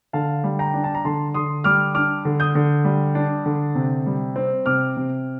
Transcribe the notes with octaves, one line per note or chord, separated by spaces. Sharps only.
D3 F5 A5
G3
G5 A#5
D4
A5
A#5
D3 A5 C6
D3 C6 D#6
G3 D6 F6
D4 D6 F6
D3
D#6 G6
D3
G3
D4
D3
C3
G3
C4
C3 D6 F6
C3